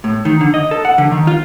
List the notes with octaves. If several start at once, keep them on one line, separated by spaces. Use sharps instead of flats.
A2
D#3
D3
D#5
A4
F#5
D3
D#3
F4